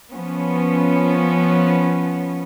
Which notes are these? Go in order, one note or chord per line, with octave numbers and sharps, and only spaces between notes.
F3 B3 C#4